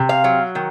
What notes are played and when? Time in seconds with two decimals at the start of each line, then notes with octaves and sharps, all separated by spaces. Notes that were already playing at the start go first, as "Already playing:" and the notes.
Already playing: C3
0.09 F5
0.24 F#3
0.55 D#3